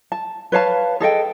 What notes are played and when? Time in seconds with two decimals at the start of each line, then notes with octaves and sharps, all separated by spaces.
0.12 A5
0.52 B4 C#5 F5 A5
1.00 G#4 A4 D#5 G5